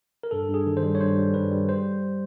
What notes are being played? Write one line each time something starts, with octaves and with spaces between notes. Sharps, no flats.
A#4
G2 A4
G2
G#4
D#3
C5
G3
C#5
G2 C5
G3
G2 B4
G3
C5